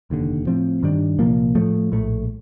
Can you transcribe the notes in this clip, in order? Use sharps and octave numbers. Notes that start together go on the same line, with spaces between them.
F1 D#2 D3
A2 F3 C4
G2 D#3 G3 D4
C2 A#2 F3 A#3
A2 F3 A3
A#1 A2 A3